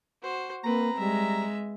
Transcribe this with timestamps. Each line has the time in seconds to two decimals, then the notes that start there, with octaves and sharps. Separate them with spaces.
0.22 F#4 C5
0.64 A#3 C4 B4 A#5
0.99 G3 G#3 E5